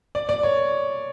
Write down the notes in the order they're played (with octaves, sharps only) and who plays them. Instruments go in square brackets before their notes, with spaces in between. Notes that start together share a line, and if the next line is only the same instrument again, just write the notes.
[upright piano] D5
D5
C#5